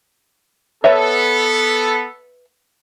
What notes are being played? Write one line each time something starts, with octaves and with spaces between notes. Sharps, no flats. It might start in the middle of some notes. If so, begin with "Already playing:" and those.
B3 A4 B4 C#5 E5